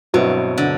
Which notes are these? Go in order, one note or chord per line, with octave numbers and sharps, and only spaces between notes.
G1 G2 B2 F#3 C4 E4
D3